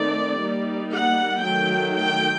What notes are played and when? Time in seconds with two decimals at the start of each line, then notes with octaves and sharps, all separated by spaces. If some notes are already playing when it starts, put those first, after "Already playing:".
Already playing: D#3 A3 C4 D#4 D5
0.39 G3 A#3 D#4
0.91 F#5
1.43 D#3 F#3 A3 G5
1.95 G5